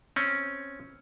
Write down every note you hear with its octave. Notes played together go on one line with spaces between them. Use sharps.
C4 C#4